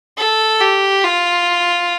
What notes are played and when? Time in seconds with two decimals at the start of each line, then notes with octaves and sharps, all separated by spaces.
0.18 A4
0.61 G4
1.04 F4